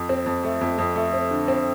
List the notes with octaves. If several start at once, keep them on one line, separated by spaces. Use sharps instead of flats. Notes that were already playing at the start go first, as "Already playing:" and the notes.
Already playing: F2
C4
F2
A3
F2
F2
A3
C4
D3
C4